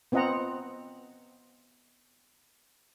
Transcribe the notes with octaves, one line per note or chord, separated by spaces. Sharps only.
B3 C4 F4 D#5 F#5 A#5